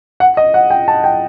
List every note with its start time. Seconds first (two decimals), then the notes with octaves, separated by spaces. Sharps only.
0.20 F#5
0.37 D#5
0.54 F#5
0.70 G5
0.88 A5
1.04 G5